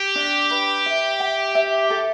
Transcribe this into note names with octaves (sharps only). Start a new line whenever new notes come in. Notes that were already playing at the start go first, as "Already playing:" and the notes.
Already playing: G4
D4
B4
E5
G5
E5
A4